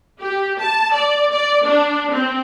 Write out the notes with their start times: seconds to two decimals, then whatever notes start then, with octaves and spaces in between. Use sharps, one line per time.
0.20 G4
0.60 A5
0.94 D5
1.32 D5
1.65 D4
2.12 C4